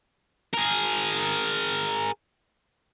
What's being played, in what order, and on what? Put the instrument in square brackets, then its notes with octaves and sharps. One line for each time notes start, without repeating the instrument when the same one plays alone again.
[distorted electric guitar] G#4 A#4